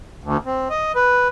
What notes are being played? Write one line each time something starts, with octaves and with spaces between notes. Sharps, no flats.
D2
C4
D#5
B4